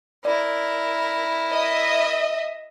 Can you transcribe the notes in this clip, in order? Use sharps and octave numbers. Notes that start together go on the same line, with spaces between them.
E4 A#4 D5
D#5 E5